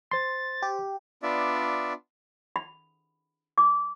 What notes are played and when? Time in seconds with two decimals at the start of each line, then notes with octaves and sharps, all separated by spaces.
0.11 C5 C6 A6
0.62 G4
1.23 B3 D4 F4 D5 E5
2.56 B5
3.58 D6